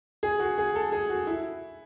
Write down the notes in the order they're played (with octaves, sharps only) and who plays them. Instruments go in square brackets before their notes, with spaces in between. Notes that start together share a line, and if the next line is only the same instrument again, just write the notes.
[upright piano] G#4
F#4
G#4
A4
G#4
F#4
E4